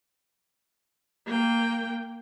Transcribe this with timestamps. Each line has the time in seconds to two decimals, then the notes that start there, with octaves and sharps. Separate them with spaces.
1.26 A#3 G5